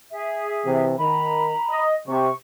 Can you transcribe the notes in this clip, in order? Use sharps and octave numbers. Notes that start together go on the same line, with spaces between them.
G#4 E5
C3 E3
D#3 A#5 B5
D#5
C3 C#6